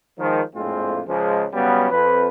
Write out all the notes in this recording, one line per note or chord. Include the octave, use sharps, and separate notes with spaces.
D#3 F3 G#3
A#1 F2 A2 G#3 C4 F4
C#2 F3 G#3
C#3 F#3 G3 B3
F2 B4